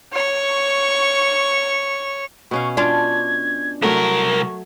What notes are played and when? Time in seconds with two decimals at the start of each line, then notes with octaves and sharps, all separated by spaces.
0.13 C#5 C#6
2.51 B2 C#4 F5 C#6
2.77 D4 F4 G#6
3.82 C2 F#3 A3 A#4 C#6